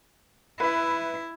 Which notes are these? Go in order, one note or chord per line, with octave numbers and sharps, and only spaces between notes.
E4 B4 E5